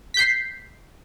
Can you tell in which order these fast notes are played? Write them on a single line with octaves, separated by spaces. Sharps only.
B6 G6 C7